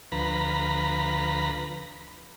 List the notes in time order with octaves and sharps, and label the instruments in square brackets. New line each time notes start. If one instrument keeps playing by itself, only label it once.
[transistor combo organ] D2 F3 B4 A#5 B5